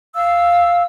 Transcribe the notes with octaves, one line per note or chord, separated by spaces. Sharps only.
F5 E6